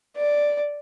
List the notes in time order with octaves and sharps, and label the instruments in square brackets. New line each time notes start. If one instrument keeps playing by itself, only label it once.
[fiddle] D5